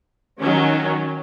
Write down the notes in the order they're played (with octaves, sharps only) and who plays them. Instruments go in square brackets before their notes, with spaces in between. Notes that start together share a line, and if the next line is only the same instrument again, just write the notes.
[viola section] D#3 F#3 C#4